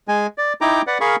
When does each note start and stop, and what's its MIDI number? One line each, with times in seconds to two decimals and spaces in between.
0.08 0.27 56
0.08 0.27 80
0.38 0.53 74
0.61 0.82 63
0.61 0.82 64
0.61 0.82 79
0.61 0.82 82
0.61 0.82 86
0.87 0.98 71
0.87 0.98 74
0.87 0.98 78
1.01 1.16 68
1.01 1.16 70
1.01 1.16 77
1.01 1.16 83
1.01 1.16 85